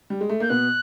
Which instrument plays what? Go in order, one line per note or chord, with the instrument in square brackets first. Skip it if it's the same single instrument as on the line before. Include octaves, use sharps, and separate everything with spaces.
[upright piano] G3
G#3
A3
[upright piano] A#3 [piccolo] G6
[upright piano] B2 B3 [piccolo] F#6